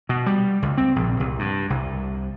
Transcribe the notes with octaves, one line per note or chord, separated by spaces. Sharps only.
B2
G3
C#2
C4
A#1
C2
G2
C2